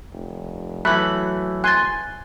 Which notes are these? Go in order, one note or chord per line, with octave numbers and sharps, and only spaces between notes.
F1
E3 F#3 A3 B5 F#6
G#5 C6 F#6 A6